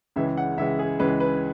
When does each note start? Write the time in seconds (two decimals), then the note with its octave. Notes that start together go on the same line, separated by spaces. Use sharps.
0.16 C#2 C#3 E3 G#3 E5
0.37 F#5
0.57 C#2 C#3 E3 G#3 E5
0.79 G#4
0.99 C#2 C#3 E3 G#3 B4
1.20 B4